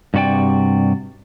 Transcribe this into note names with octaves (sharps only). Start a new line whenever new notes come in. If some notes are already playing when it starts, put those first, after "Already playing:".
G2 C3 F#4 D5 G5